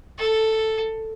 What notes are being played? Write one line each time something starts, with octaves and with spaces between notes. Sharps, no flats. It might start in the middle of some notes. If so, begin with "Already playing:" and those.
A4